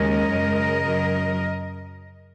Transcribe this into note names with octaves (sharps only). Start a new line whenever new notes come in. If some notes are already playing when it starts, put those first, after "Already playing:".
Already playing: D#2 C#3 G#3 C#4 A#4 D#5
F#2 C#3 G#3
F#2 C#3 F#3